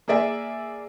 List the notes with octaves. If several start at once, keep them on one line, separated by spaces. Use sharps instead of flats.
A#3 G#4 D5 E5 G#5